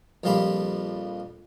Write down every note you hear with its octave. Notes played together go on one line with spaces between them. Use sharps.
A#1 F2 G3 A#3 G4 B5